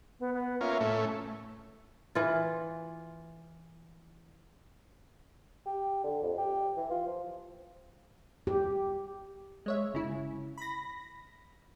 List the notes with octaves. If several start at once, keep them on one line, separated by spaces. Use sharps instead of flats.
B3
B3
A#3 C#4 F4 E5
A2 A3 C#4
E3 F4
G4
D3
F2
G4
E3
F4
F3
G4
G#3 C#5 E5
G1 C#3 E4
B5 A#6